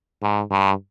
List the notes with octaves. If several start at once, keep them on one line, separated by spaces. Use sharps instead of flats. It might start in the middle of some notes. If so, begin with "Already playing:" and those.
G#2
G2